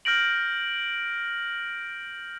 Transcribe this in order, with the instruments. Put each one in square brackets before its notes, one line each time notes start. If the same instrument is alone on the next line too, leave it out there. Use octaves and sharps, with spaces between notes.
[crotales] F6 G6 A#6 D7 F#7